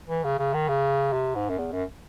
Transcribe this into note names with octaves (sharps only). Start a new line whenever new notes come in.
E3
C#3
C#3
D#3
C#3
C3
G#2
F#2
E2
F#2